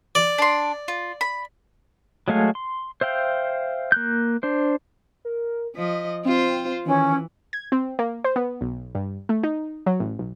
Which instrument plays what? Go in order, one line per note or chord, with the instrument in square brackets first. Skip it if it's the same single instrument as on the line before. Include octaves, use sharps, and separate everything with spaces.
[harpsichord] D5
[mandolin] D4 C6
F4
B5
[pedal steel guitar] F#3 G#3 A3 F5 G#5
C6
C5 E5 F5 G5
A#3 F#6 G6
D4 C5
[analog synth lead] A#4
[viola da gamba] F3 D#5 [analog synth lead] B6
[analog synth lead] C4 [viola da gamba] F4 C5
[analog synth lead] D#3 [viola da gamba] E3 [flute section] C#4
[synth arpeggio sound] G#6
C4
A#3
C5
B3
B1
G2
A3
D#4
F#3
A1
B1